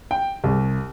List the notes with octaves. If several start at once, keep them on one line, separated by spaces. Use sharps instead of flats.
G5
C2